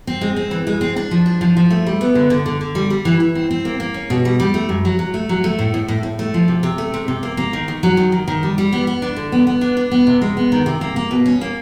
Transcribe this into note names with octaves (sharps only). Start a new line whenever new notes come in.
C4
G#3
C4
E3
G#3
C4
D4
F3
D4
F3
F3
A3
G3
B3
D3
D3
D3
D3
G3
G3
E3
E3
C4
C4
A#3
A#3
C#4
B2
G3
G3
A3
F#2
F#3
F#3
A3
F#3
A3
A2
A2
A2
A2
A3
F3
C3
C3
A3
C3
C3
A#3
A#3
D#3
D#3
F#3
D#3
D#3
D#3
G3
G3
B3
B3
D4
D3
B3
B3
D4
D4
B3
C3
G#3
B3
D#3
C3
A#3
A#3
B2
C#4
A#3